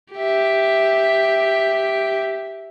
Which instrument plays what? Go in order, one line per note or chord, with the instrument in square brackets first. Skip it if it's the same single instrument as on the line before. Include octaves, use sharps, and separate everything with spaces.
[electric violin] G4 E5